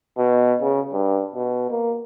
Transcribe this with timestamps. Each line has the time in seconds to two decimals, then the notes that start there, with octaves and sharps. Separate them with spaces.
0.18 B2
0.61 C#3
0.92 G2
1.35 B2
1.70 A#3